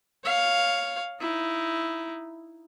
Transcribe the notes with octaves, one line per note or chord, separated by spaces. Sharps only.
C#5 F5
D#4 E4